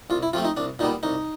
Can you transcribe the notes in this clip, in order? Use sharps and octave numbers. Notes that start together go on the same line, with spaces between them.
C2 F4
E4
C3 F3 A3 C4 F4
D#4
C2 D4
A#2 G3 B3 D#4
C2 D#4